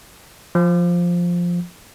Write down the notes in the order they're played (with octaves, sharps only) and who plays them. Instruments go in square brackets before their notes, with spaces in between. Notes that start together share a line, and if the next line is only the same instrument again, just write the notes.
[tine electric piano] F3